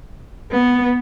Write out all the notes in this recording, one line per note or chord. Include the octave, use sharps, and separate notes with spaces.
B3